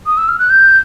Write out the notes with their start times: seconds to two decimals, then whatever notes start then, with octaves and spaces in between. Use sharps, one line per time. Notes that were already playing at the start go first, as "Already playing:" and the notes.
0.06 D#6
0.17 E6
0.28 F6
0.39 F#6
0.50 G6